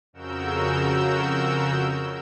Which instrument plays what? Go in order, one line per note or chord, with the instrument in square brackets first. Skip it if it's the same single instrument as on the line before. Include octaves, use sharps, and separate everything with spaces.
[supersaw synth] F2 C#3 F#4 A#4 E6 G6